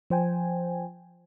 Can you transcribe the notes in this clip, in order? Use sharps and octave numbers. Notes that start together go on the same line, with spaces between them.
F3 C5 G5 G#5